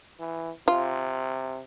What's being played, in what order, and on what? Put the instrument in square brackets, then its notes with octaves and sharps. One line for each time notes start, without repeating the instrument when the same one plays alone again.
[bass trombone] E3
[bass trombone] C3 [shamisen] F4